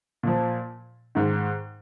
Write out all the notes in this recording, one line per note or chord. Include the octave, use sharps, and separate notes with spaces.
A#2 F3
G#2 D#3